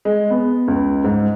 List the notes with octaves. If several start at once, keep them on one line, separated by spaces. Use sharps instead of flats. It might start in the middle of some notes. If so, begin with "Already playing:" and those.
G#3
B3
C#2
G#2